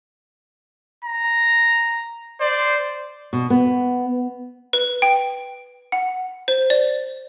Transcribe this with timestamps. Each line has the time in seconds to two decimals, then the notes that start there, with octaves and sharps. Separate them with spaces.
1.05 A#5
2.41 C5 D5
3.33 B2
3.50 B3
4.73 B4
5.02 G5
5.92 F#5
6.48 C5
6.70 D5